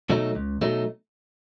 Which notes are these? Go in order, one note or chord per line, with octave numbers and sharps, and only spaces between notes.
B2 F#3 A3 D#4
C#2
B2 F#3 A3 D#4